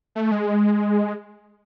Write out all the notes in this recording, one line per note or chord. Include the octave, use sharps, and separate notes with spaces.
A3
G#3